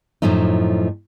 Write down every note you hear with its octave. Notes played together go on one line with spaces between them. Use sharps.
F#2 A2 F3 A3 D#4